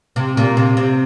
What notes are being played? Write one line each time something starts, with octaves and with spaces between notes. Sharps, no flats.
C3
A#2
C3
C3